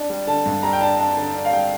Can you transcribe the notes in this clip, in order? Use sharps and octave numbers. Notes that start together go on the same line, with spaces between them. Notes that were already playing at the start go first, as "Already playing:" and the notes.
Already playing: D4
G3
D3 A5
G2
G3 A#5
G5
D4 A5
D4 A5
D3 A5
D4
F5
G3 G5